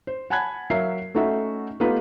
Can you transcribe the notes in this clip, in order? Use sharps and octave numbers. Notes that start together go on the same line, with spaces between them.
C5
F#5 G#5 A5 B5 F#6 G#6
F#3 A#4 E5 F5 C7
A3 C#4 D#4 F#4 A4 E5
A3 B3 D#4 F4 G4 B4